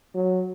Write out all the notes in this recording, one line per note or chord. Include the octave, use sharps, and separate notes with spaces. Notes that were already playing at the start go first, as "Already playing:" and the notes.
F#3